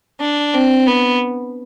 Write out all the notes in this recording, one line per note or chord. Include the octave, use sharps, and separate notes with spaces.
D4
C4
B3